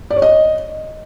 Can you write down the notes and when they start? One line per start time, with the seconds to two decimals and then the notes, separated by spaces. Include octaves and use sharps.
0.11 D5
0.16 C#5
0.22 D#5